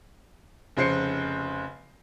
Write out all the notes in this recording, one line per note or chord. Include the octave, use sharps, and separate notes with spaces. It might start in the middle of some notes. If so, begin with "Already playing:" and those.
F1 C#3 C5 C7 C#7